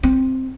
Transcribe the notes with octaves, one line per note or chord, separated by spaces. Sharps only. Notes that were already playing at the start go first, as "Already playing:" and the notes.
C4